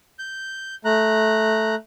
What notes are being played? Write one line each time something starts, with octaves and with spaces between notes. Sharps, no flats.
G6
A3 A#5 F#6